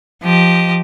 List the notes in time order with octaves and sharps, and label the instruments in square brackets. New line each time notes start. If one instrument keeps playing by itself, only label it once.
[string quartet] F3 G4 D#5